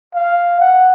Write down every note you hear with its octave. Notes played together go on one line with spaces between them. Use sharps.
F5
F#5